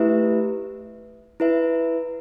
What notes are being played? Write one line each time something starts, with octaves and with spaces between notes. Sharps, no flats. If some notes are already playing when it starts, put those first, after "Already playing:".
Already playing: A3 E4 G4 B4 E5
E4 B4 E5